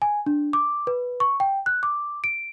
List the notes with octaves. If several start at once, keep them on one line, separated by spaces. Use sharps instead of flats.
G#5
D4
D6
B4
C#6
G5
F#6
D6
D7